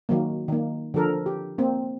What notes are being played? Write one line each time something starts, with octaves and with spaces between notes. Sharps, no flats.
D#3 F#3 A#3
D#3 A#3
D3 F3 A4 A#4
G4
A#3 C4